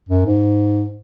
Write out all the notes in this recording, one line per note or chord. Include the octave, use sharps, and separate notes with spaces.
F#2
G#2